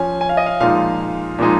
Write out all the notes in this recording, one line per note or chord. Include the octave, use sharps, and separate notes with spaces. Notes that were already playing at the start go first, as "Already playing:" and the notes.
Already playing: F3 C#4 G#5
G#5
F5
D#5
F5
A#2 F3 G#3 D#4 F5
A#2 F3 G#3 D#4